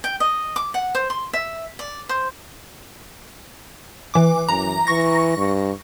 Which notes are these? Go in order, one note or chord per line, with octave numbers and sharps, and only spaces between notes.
G5
D#5
D6
F#5
C5
C6
E5
D5
C5
E3 D6
F#2 A#5
E3 C#6 A#6
G2